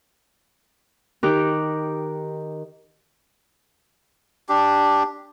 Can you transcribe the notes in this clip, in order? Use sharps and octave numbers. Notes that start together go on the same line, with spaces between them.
D#3 D#4 G4 A#4 D6 F#6
D4 G4